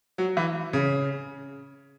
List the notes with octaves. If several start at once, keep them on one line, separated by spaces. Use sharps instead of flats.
F#3
E3
C#3